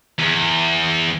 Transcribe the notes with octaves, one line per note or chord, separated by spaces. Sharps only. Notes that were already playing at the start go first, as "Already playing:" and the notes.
E2